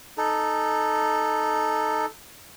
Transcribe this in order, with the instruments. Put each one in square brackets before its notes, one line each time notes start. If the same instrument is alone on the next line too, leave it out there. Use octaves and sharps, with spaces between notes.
[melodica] D#4 A4